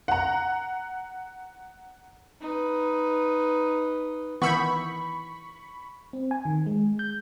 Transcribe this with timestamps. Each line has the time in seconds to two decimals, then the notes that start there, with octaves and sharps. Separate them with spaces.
0.08 F#5 A#5
2.41 D#4 B4
4.42 D#3 E3 B3 B5 C#6 E6 G6
6.13 C4
6.31 G#5
6.45 D#3
6.66 G#3
6.99 G6